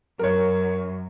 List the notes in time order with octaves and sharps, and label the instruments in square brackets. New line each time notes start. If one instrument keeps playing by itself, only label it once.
[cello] F#2 [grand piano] A#4 C#5